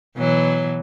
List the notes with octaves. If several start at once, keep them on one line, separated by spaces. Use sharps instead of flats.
B2 E3 F#3